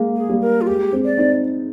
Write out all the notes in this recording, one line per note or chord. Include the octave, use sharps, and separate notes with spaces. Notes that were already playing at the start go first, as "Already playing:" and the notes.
Already playing: G#3 A#3
G#4
G3 A#3
A#4
F4
G#3 G4
G#3 C4
D5
C4 D#4